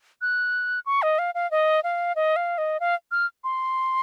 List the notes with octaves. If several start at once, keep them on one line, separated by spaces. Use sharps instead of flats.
F#6
C#6
D#5
F5
F5
D#5
F5
D#5
F5
D#5
F5
F6
C6